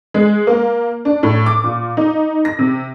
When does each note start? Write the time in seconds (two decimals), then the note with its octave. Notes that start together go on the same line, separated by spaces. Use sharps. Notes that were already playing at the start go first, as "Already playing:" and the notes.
0.14 G#3
0.47 A#3
1.05 D4
1.23 A2
1.46 D6
1.64 A#2
1.97 D#4
2.45 A#6
2.59 C3